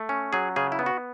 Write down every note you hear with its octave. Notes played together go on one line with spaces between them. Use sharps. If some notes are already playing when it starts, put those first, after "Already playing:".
Already playing: A3
C#4
F#3 G#4
C#3 G#4
E4
B3
F#4